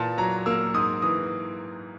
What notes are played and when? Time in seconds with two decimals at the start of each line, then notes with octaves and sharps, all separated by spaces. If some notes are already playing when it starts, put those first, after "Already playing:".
Already playing: A#2 E3 A5
0.18 F#3 A#5
0.46 A#3 E6
0.74 G#2 D#6
1.02 E3 D#6